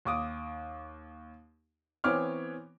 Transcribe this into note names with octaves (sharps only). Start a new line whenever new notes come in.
D#2 D6 D#6
E3 B3 C4 C#5 D6 F6